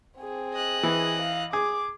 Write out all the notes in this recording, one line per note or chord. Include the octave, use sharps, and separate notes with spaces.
C4 G#4
D#5 F#6
E3
F5
G#4 D6